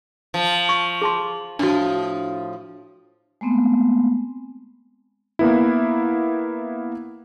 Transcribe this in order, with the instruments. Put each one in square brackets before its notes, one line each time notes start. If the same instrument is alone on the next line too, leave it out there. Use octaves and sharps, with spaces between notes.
[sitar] F3
[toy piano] C#6
G#4 A5 C6
[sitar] A2 F3 [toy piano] D4 F#4
[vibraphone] G#3 A3 B3 C4
[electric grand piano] A#3 B3 E4